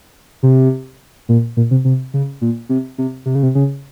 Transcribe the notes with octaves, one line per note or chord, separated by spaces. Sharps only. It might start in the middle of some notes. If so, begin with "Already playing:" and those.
C3
A#2
A#2
C3
C3
C#3
A#2
C3
C3
C3
C#3
C3
C#3